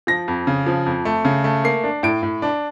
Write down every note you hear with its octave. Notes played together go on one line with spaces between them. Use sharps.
F3 A#6
F2
C#3
F3
F2
A3
C#3
A3
A#3 C7
D4
A2 D7
A2
D4